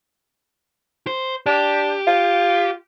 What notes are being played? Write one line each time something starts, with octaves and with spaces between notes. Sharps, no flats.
C5
D4 G4
F4